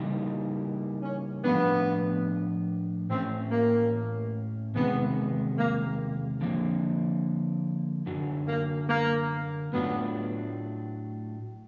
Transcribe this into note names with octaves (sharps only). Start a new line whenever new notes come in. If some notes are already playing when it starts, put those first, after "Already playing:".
Already playing: C#3 E3 G3 A#3 D#4
C#4
A2 F3 A3 B3 D4
A2 E3 A3 C4 C#4
A#3
E2 C3 D#3 G#3 B3
A#3
D3 F3 A#3
F#2 D3 F#3
A#3
A#3
A2 F#3 A3 B3 D4 F4